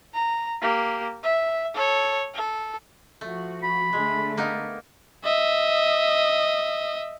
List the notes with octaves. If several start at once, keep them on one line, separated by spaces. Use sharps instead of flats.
A#5
A#3 G4
E5
A4 C#5
A4
F3 A3 F#4
B5
D3 G#3 A3
A#3 B3 D#4
D#5 E5